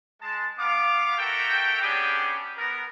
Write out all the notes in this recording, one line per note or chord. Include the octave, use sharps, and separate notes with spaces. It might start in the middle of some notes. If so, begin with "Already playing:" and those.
G#3 A5
B3 F5 D6
F#4 A4 A#4 E5 G5
G3 B3 C#4 D4 G4 G#4
B3 A#4